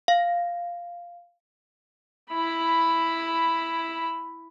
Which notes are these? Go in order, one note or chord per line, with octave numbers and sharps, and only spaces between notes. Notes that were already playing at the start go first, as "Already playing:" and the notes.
F5
E4 B5